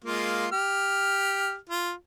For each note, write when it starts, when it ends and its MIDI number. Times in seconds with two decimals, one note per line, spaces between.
0.04 0.47 56
0.04 0.47 58
0.04 0.47 65
0.52 1.55 67
0.52 1.55 89
1.69 1.92 65